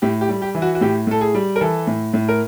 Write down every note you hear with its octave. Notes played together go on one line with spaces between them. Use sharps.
A2 G4
G4
G3
G4
E3
F#4
F#4
A2 G4
A2 A4
G#4
G3
A#4
E3 A4
A2
A2
A#4